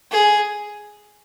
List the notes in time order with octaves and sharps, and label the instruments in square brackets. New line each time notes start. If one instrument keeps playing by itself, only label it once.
[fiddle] G#4